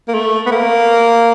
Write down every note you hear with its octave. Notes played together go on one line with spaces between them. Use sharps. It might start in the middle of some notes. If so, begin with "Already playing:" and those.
A#3
A3
B3
A#3